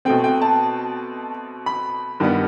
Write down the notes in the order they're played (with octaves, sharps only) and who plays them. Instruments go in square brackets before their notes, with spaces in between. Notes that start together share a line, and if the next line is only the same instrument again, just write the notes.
[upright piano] B2 A3 C4 G5
G5
A5
B5
G2 D#3 G3 B3